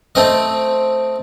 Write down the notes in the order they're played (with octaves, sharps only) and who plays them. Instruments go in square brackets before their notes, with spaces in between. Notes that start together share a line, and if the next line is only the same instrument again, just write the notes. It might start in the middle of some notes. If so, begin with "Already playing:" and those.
[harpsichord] A3 C4 D#5